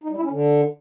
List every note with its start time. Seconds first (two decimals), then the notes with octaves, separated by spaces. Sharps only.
0.04 D#4
0.10 G3
0.17 E4
0.24 C#4
0.30 D3